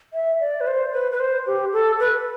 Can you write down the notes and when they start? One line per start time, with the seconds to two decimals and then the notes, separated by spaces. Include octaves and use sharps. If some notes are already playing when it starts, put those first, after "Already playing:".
0.13 E5
0.40 D5
0.61 B4
0.67 C5
0.93 B4
1.12 B4
1.20 C5
1.47 G4
1.73 A4
2.00 B4